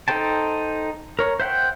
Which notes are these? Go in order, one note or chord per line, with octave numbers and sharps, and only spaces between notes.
D#4 A4 C5 G5 A5
A#4 C#5
C5 E5 F#5 G5